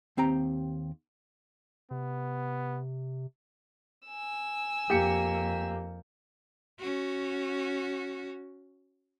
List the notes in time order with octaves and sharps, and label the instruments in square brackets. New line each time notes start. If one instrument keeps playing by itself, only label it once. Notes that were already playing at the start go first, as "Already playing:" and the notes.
[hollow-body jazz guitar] D#2 C4 G4 A#5
[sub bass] C3 [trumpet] B3
[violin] G#5 E6
[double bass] F2 A#3 [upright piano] G4 C#7
[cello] C#4 F#4